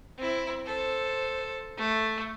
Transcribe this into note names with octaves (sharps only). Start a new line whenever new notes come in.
C4 E4
A4 C5
A3